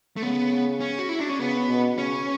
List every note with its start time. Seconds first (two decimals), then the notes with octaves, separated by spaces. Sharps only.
0.17 A3
0.23 C#3 B3
0.80 C#4
0.99 F#4
1.09 E4
1.20 D4
1.29 C#4
1.39 C#3 B3
1.68 B2
1.98 C#3 C#4